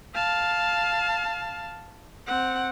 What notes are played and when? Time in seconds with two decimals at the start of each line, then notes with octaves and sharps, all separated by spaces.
0.14 F5 A5
2.26 C4 F#5